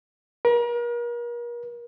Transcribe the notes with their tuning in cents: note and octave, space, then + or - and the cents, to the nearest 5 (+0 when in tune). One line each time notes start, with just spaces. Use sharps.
A#4 +40